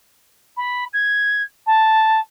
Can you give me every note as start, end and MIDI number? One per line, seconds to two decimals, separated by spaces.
0.57 0.85 83
0.93 1.43 92
1.66 2.20 81